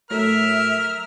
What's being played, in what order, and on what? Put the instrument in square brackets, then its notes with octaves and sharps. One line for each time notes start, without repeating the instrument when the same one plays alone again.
[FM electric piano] A2 F#3 A3 [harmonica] A#4 F6 [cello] E5